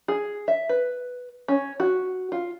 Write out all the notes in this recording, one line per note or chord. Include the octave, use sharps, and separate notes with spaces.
G#4
E5
B4
C#4
F#4
F4